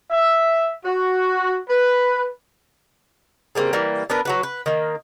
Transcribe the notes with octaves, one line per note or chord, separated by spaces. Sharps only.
E5
F#4
B4
C#3 G3 A#3 C4
E3 G3 A#3
B3 D4 A#4 B4
F#3 F#4 B4
B4
D#3 A#3